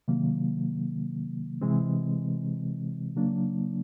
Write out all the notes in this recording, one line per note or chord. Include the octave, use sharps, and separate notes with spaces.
C3 D#3 F#3 A#3
C3 E3 G#3 C4
C#3 F#3 A#3 D4